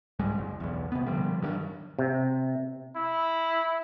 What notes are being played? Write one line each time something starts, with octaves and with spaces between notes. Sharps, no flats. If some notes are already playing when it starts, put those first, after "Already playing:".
C2 G#2 G3 G#3
F#1
B1 E2
C3 B3
A#2 D3 F3 G3
G2 D#3 F#3
C3
E4